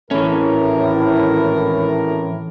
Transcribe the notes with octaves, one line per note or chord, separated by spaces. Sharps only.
G#1 A2 E3 C#4 A#4